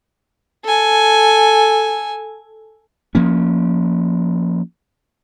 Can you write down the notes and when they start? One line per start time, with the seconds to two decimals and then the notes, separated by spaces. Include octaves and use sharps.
0.64 A4 G#5
3.15 F3 A#3 C#4